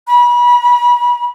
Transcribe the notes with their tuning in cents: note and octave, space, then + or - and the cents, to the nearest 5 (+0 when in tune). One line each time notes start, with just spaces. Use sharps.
B5 -35